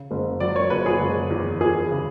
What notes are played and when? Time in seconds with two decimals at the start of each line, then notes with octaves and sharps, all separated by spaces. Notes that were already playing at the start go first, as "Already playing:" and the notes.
Already playing: C#3
0.11 F#1
0.40 F#3 D5
0.56 C#5
0.70 F#1 B4
0.86 G#4
1.00 F#1
1.30 E2
1.61 E2 G#4
1.91 C#3